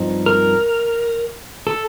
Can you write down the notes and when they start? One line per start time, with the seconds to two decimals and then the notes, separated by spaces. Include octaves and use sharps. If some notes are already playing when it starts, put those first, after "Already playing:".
Already playing: G2 F3 C4 D#4
0.26 A#4
1.67 A4